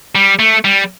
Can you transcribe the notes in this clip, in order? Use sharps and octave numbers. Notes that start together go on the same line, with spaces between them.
G3
A3
G3